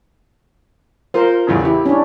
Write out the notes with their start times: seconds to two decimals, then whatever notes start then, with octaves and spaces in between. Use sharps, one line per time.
1.14 F4 A#4 C5
1.47 A1 E2 C#3
1.65 E4 G4
1.86 C#4 D4